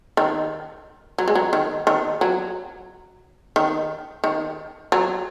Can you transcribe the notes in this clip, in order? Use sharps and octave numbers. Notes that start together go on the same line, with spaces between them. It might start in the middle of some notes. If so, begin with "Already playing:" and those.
D#3
F#3
G#3
F#3
D#3
D#3
F#3
D#3
D#3
F#3